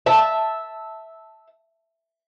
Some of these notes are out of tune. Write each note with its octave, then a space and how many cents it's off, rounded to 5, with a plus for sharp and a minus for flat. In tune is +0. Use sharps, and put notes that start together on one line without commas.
E5 -10 A5 +0